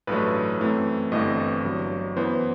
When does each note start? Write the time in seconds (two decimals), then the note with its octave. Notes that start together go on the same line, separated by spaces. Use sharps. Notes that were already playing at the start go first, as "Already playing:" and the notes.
0.07 A1 G2 F#3 A3 B4
0.60 F#2 E3 A3 C4
1.12 G1 G2 E3 A3 C4 D#5
1.64 G1 G2 F#3
2.16 F#2 E3 B3 C5